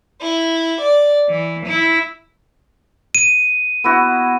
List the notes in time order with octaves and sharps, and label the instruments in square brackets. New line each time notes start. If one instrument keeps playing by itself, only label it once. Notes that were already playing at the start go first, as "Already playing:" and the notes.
[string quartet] E4
D5
E3
E4
[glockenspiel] D#7
[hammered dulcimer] B3 E4 F#4